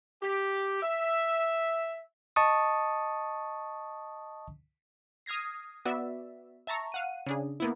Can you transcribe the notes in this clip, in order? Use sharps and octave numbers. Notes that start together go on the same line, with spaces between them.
G4
E5
D#5 A5 C#6 D#6
D#6 F6 G#6 A#6 C7
B3 F#4 D5 E5
E5 A5 A#5 C#6
F5 F#5 D#7
C#3 D4 G#4
A#3 B3 E4